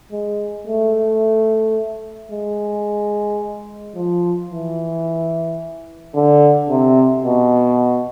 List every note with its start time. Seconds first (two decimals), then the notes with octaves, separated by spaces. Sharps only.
0.12 G#3
0.67 A3
2.32 G#3
3.96 F3
4.51 E3
6.15 D3
6.70 C3
7.24 B2